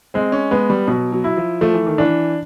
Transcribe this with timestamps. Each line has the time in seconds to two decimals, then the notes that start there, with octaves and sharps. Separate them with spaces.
0.14 G#3 C4
0.32 C#4
0.51 G#3 B3
0.70 G3
0.88 B2 F#3
1.12 F#3
1.24 E4
1.37 F3
1.61 F3 A3
1.74 E3
1.87 D#3
1.98 E3 D4